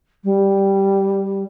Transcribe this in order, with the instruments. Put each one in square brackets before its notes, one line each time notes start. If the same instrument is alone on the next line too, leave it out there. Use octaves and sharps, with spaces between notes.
[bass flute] G3